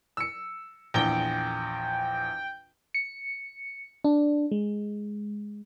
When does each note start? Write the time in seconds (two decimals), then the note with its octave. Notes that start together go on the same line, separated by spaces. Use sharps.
0.17 E6 C#7
0.94 A#1 E2 G5 G7
2.94 C#7
4.04 D4
4.52 G#3